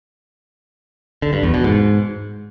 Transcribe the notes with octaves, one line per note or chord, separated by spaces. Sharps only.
D3
G2
E2
B2
G#2